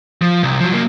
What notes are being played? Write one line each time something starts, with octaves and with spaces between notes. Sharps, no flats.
F3
C2
F3 F#3
F#3 A#3